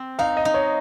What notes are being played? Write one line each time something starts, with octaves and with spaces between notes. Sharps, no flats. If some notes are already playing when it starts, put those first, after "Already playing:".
Already playing: C4
D#4 F5
D#5
D#4
C#5